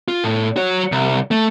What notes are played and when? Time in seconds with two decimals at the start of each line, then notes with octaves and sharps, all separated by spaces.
0.08 F4
0.24 A2
0.56 F#4 C#5
0.92 C2
1.31 A3